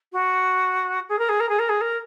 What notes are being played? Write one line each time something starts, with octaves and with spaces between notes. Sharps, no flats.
F#4
G#4
A#4
G#4
A#4
G#4
A#4
G#4
A#4